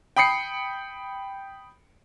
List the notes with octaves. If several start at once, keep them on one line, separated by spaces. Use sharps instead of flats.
G5 B5 D#6 C7 C#7